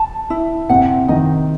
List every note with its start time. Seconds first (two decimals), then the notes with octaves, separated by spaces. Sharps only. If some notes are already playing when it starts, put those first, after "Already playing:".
Already playing: A5
0.30 E4
0.69 C3 C4 F#5
1.08 D#3 D#4 D#5